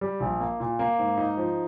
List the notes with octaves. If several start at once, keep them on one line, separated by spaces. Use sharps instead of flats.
G3
A#1
A#3
A#2
A#3
G#2
D#4
F3